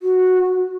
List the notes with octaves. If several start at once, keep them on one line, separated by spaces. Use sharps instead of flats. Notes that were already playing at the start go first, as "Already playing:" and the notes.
F#4